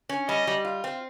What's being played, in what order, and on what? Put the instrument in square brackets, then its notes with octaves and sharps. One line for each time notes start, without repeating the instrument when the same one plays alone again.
[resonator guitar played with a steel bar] C#4
[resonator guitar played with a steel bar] G3 [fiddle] D#5
[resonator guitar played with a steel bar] G3
F4
C4